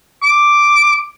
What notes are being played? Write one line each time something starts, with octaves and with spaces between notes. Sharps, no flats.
D6